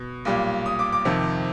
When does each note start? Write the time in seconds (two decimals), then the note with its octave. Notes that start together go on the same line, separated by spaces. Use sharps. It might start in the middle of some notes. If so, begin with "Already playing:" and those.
Already playing: B2
0.25 B1 A#2 G3
0.66 D#6
0.79 D6
0.92 D6
1.05 F2 C3 D#3